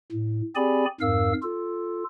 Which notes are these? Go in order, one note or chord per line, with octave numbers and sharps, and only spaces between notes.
A2
C4 G4 G#4 D5 G#5 B5
F2 G#2 A#4 F5 E6
F4 A4